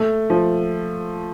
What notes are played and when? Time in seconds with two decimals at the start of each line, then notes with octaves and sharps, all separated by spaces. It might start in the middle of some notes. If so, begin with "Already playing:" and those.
Already playing: A3
0.30 F3